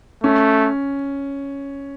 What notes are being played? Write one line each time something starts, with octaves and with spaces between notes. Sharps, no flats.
A3 C#4